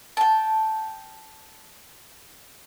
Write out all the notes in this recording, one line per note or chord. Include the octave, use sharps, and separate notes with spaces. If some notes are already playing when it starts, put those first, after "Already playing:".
G5 A5